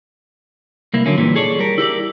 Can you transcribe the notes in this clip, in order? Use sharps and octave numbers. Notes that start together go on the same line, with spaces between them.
C2 A#3 E4
D3 F#3 A#3 C#4
A#2 E3 G3
G#4 A4 C#5 D5
G3 A#4
E4 G4 A#4 D5